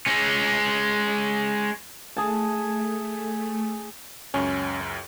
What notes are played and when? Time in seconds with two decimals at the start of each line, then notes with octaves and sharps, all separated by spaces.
0.07 G#3 C#4
2.16 A3 G#4 A5
4.34 C#2 F#2 C#4